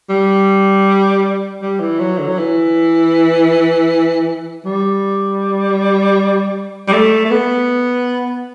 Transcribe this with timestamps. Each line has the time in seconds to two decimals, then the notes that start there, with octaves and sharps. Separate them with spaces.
0.10 G3
1.62 G3
1.80 E3
1.99 F#3
2.18 D3
2.28 F#3
2.38 E3
4.65 G3
6.88 G3
6.93 A3
7.25 A3
7.31 B3